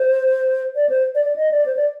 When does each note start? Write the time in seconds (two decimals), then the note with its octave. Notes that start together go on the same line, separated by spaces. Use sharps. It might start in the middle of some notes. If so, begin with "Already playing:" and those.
Already playing: C5
0.76 D5
0.89 C5
1.15 D5
1.25 D5
1.36 D#5
1.51 D5
1.66 C5
1.77 D5